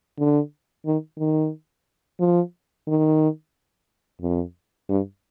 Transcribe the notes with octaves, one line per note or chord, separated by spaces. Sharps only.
D3
D#3
D#3
F3
D#3
F2
G2